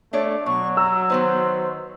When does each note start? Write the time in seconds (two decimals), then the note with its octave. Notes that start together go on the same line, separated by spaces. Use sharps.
0.13 A3 D4 C#5 D5
0.46 B2 F#3 C#6
0.77 A#5 E6
1.10 D#3 B3 D#4 C5